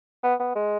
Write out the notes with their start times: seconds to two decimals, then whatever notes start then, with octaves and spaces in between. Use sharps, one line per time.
0.23 B3
0.39 B3
0.55 G#3